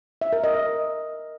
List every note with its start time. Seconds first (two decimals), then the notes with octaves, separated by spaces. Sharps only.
0.21 E5
0.33 A#4
0.44 D#5
0.55 A#4